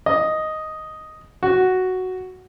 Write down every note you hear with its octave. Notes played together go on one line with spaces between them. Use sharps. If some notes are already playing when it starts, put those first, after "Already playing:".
D#5
F#4